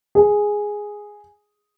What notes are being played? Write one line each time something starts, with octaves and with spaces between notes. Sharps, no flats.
G#4